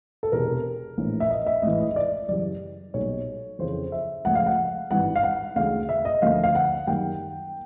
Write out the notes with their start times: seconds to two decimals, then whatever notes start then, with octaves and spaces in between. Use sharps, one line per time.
0.23 A4
0.32 E1 E2 C3 A#4
0.98 A#1 A2 E3
1.20 E5
1.31 D#5
1.46 E5
1.62 A1 G#2 E3 D#5
1.80 D#5
1.96 D5
2.28 F#2 C#3 E3 G3 D5
2.94 B1 A#2 G3 C#5
3.59 F2 C#3 E3 C5
3.92 E5
4.25 C#2 C#3 F3 A3 F#5
4.35 F5
4.46 F#5
4.91 G#1 G2 E3 F#5
5.16 F5
5.23 F#5
5.56 D2 C#3 E3 G#3 F5
5.89 E5
6.05 D#5
6.22 D2 D3 F3 A#3 F5
6.43 F5
6.55 F#5
6.87 F#2 D#3 G3 A#3 G5